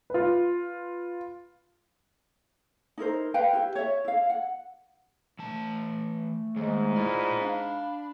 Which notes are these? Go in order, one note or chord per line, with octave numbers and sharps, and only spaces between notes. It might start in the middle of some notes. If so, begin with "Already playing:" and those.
F4 B4
D#4 E4 A#4 C5
B4 F5 G5
E4 G4
C#5 E5
E4 F5
F#5
E3 A3 A5
D#2 G#2 G#3
E4 F4 D5 F6
D4 F5 B5